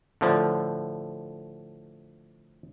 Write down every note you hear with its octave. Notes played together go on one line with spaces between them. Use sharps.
A2 D3 F3